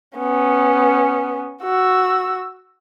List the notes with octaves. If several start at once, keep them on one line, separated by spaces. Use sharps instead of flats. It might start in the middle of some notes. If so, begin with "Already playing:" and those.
B3 C#4
F#4 E6